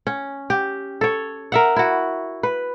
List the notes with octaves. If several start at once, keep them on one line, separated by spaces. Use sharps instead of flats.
C#4
G4
A4 C#5
A#4 E5 F#5
E4 F#4
B4